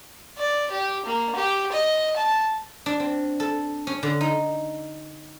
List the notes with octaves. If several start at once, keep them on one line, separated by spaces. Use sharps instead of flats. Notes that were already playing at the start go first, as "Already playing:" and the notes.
D5
G4
A#3
G4
D#5
A5
D4
C4
A4
C#4
D3
D#4